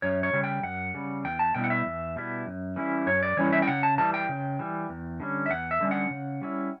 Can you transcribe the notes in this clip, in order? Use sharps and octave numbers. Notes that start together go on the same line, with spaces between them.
F#2 C#5
C#5
C#3 G3
G5
F#2 F#5
C#3 G3
E2 G5
A5
B2 G3 B3 E4 G5
F#5
E5
E2
B2 G3 B3 E4
F#2
E3 G3 C#4 E4
F#2 C#5
D5
E3 G3 C#4 E4 C#5
E5
G5
C#3 F#5
A5
E3 G3 A5
G5
C#3
E3 G3
E2
D3 G3 C#4
E5
E2 F#5
E5
D3 G3 C#4
F#5
C#3
G3 C#4 E4